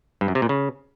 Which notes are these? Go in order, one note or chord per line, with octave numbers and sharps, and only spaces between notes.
G2
F#2
C3
A#2
C#3